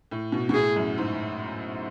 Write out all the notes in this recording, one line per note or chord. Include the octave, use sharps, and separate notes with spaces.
A2
B2
B2
A2 G#4
F#2
G#2